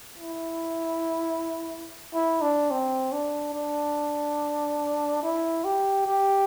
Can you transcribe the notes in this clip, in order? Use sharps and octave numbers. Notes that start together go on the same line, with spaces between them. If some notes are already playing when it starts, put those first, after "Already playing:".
E4
E4
D4
C4
D4
D4
E4
G4
G4